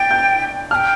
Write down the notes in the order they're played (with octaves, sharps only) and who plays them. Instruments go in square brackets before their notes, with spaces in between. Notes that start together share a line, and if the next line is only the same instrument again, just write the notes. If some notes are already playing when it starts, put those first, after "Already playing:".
Already playing: [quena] G5 [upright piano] A6
[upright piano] G6
[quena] A5 [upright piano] F6
[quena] G5